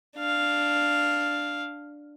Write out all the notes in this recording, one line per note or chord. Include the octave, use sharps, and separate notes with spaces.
D4 F5